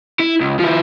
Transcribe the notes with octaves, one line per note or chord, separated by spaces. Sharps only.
E4
C#2
F3 E4